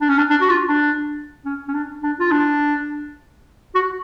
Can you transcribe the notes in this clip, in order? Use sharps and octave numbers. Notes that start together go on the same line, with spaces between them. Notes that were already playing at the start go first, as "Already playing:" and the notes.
D4
C#4
D4
D4
F#4
F4
D4
C#4
C#4
D4
D4
F4
D4
F#4